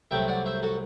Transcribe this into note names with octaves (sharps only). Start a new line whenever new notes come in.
C2 C3 F#3 A3 E5 G5
D5 F#5
C5 E5
F#4 A4